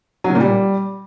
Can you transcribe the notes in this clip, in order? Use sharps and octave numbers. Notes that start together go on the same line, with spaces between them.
F#3
C#3
A#2
G3